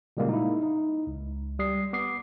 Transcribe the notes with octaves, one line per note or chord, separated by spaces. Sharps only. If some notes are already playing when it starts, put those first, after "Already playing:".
A#2 C#3 G3 G#3 A#3 C#4
D#4 E4
D#4
C#2
G3 D#6 C7
B3 D6 D#6 C7